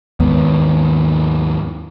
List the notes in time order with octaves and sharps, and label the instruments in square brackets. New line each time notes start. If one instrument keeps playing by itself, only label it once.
[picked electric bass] D#2 G#2 D#3 B3